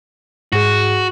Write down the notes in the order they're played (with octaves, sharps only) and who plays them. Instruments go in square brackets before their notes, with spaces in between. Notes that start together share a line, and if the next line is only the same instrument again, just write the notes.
[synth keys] G#2 G#4 [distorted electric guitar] F#4